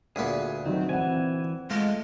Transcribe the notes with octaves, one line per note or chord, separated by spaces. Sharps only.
D2 A#2 B3 G#4
D#3 F#3 C4
E3 C4 F#5 G#5
G#3 A3 F4